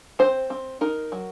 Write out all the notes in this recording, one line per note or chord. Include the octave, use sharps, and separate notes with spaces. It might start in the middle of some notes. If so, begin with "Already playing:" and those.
C4 C5
C4
D#4 A#4
F#3